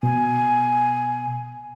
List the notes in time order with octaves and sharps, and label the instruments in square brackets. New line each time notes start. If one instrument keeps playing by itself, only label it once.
[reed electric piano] B2 [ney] G#5